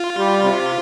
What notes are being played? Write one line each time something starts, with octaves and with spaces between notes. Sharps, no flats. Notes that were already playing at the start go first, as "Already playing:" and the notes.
Already playing: F4
G3
C3